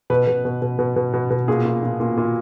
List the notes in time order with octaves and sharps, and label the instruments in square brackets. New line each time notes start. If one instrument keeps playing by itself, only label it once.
[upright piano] B2 B4
B2
B2
B2
B2
B2
B2
B2
A#2 G#4
A#2
A#2
A#2
A#2